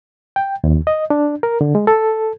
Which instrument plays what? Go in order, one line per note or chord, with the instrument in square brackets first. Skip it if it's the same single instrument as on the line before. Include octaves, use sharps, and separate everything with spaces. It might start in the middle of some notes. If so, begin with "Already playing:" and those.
[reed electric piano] G5
D#2
D#5
D4
A#4
D3
G#3
A4